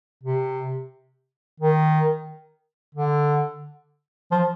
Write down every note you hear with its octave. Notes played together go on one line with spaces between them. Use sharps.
C3
D#3
D3
F3